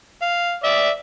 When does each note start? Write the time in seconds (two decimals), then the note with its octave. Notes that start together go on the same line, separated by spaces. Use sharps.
0.22 F5
0.64 D5 E5